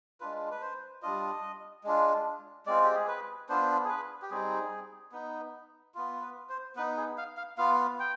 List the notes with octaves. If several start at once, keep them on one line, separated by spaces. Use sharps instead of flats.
G#3 D4 F4 B4
B4
C5
G3 D4 F4 D#5
G#3 D4 F4
G#3 C4 F4 D5
G4
G#4
B4
B3 D4 F4 C5
G#4
B4
G4
G3 C4 D#4 G#4
B3 D#4
B3 F4
B4
C5
B3 D#4 B4
G#4
F5
F5
B3 F4 F5
G5